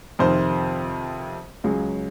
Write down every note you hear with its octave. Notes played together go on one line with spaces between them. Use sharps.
F2 C3 D#3 C5
C#2 C#3 F#3 G#4